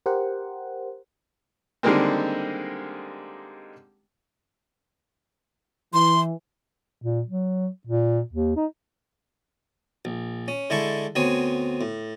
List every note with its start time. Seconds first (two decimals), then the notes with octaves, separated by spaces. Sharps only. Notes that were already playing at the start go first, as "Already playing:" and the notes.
0.06 G4 A#4 C5 F#5
1.83 D3 D#3 G3 G#3 A#3 C4
5.94 E3 C6
7.02 A#2
7.27 F#3
7.87 A#2
8.33 D#2
8.56 D#4
10.05 A#1
10.48 C#4
10.70 D3 G#3 E4 A5 C#6
11.16 D2 B3 C4 C#5 G#5
11.81 A2